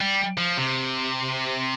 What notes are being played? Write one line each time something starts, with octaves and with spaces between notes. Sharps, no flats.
G3
F3
C3